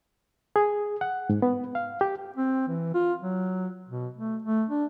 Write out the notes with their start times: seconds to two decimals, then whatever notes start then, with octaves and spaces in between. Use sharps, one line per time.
0.56 G#4
1.01 F#5
1.30 G#2
1.42 B3
1.75 F5
2.01 G4
2.36 C4
2.68 E3
2.94 F4
3.22 F#3
3.89 B2
4.17 A3
4.42 A3
4.69 D4